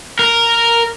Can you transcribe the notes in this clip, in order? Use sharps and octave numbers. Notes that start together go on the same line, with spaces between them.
A#4